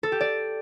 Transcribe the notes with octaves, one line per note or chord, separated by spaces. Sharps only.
A4
G4
D5